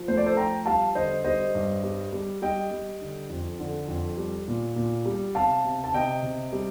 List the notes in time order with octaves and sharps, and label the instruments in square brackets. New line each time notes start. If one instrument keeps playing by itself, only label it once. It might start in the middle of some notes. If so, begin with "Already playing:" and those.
Already playing: [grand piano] F3
A3 C5
D5
A4 C5
F3 G5 A#5
G3 F5 A5
D3 C5 D#5
G3 C5 D#5
G2
G3
G3
G3 D#5 G5
G3
D3
F2
D3
F2
G3
A#2
A#2
G3
C3 F5 A5
C3
A5
C3 D#5 G5
C3
G3